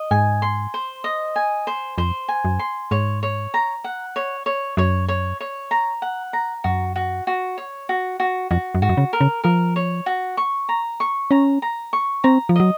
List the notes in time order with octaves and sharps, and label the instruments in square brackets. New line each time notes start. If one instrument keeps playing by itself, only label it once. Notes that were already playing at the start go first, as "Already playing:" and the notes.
Already playing: [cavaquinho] D#5
[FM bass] G#2 [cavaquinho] G#5
[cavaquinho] C6
C5
D#5
G#5
C5
[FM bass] F2 [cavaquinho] C5
[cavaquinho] G#5
[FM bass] F#2
[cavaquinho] C6
[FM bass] G#2 [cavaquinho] C#5
[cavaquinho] C#5
A#5
F#5
C#5
C#5
[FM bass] F#2 [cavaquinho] C#5
[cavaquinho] C#5
C#5
A#5
F#5
A#5
[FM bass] F#2 [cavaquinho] F#4
[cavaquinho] F#4
F#4
C#5
F#4
F#4
[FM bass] F2 [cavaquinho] F#4
[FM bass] F#2
[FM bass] G#2 [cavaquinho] F#4
[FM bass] F#2
C#3
[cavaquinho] A#4
[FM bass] C#3
[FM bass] F3 [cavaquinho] A#4
[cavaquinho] C#5
F#4
C#6
A#5
C#6
[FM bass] C#4 [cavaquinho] A#5
[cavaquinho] A#5
C#6
[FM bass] C4 [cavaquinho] A#5
[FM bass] F3
[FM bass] F#3 [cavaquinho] D#5